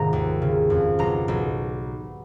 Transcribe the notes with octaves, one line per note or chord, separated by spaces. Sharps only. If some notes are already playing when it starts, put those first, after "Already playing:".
Already playing: F1 G#2 D#3 A#5
D#2
C#3
F2
B1 A#5
B1